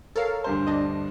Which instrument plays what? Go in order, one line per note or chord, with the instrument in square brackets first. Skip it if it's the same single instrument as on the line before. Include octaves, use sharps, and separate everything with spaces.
[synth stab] A4 A#4 F5 [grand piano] C#5
[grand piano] D2 G2 C5
[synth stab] D4 D#5